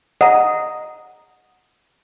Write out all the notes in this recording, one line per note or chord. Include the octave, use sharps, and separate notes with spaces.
D#5 F#5 A#5